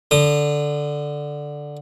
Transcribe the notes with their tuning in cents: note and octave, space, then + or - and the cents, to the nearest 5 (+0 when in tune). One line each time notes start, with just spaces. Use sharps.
D3 +0 D#6 -30